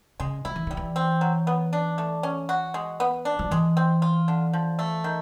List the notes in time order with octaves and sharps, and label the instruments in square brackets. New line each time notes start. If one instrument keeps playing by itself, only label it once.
[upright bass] C#3 [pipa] G#3
[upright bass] F3 [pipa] E4
[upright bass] E3
[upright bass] D#3 [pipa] G3
[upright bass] E3
[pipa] C4
F#3
B3
D4
A3
C#4
F#4
G#3
B3
D4
[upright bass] F3
[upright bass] E3 [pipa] G#3
[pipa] C4
F4
D3
F3
A3
D#3